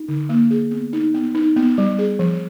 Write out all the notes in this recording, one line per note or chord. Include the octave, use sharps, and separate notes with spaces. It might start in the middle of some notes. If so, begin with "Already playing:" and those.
Already playing: D#4
D3
A#3
G#4
B3
D#4
B3
D#4
B3
G3
G#4
F3